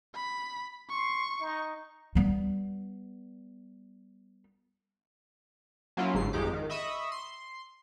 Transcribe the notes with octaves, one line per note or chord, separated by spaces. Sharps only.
B5
C6 C#6
D#4
G3 B3
F#3 A#3 C#4 E4 F4
G1 G#2 C7
G#1 F2 G#3 D#4 G4 D6
D#3
D#5 E5 B5 C#6 D#6 E6
C6